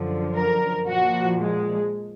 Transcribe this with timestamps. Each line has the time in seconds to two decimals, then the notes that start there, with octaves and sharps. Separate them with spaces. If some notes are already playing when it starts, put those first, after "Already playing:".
Already playing: F#2 D3 F3
0.35 A#4
0.87 A#2 F3 F#4
1.41 G#3